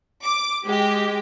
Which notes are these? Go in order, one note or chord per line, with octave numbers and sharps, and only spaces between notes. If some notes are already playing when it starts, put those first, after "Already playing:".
D6
G#3 G4